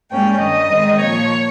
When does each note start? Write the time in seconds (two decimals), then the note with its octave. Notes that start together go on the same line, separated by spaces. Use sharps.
0.11 G#2 G3 A#3 C#4 G5
0.41 G2 D#3 G3 D#5
0.70 G#2 D#3 G3 C4
1.00 A#2 F3 A#3 C#5